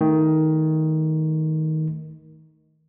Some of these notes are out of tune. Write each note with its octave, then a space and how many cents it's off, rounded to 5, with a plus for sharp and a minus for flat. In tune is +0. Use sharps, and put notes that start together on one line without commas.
D#3 +15 A3 +0